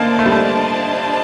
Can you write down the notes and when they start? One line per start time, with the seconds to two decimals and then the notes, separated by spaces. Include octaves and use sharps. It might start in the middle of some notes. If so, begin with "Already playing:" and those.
Already playing: A3 A#3 D4 F4 C5 D#5 A5
0.19 A3
0.26 G3
0.32 A3